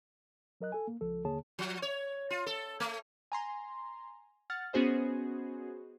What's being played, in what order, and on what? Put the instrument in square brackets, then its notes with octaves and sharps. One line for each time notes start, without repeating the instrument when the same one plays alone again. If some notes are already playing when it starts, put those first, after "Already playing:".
[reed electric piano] F#3 A#4 D#5 F#6
A4 G#5
A#3
C#2 F3 A4
D#2 D3 A#3 G#4 C#5 A5
[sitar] F3
C#5
F4
A4
A3
[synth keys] G#5 A#5 C6
F#5 F6 A6
B3 C#4 F#4 G#4 C5 D#5